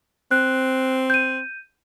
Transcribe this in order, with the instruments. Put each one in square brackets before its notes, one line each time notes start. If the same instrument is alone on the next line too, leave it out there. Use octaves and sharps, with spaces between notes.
[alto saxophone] C4 [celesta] F#6
[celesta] G6 D#7